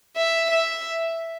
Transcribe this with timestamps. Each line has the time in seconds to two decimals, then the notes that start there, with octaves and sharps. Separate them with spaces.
0.17 E5
0.51 E5